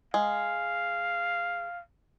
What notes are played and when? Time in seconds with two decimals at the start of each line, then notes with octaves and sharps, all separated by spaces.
0.14 G#3 F5